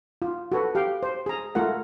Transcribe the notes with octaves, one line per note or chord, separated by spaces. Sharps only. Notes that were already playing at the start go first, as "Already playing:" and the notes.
F4
F#4 A4 B4
G4 F5 G5
C5
G#4 A#5
A3 F4 A#4 F#5